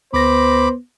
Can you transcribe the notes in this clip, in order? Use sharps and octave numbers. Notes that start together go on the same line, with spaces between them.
D2 B3 C5 B5 D6 A#6